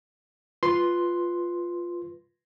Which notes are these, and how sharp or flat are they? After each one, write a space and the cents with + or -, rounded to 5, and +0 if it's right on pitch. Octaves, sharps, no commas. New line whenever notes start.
F4 +0 B4 +0 C6 +0